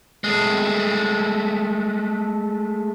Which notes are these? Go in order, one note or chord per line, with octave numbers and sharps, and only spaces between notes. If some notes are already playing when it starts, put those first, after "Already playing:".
G#3 A3